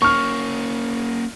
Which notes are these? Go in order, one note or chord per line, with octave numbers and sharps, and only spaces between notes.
A#3 C#4 C#6 F6